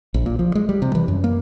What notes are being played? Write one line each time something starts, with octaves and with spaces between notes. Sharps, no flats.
A#1
A#2
F3
G#3
G3
C3
E3
F#2
A#3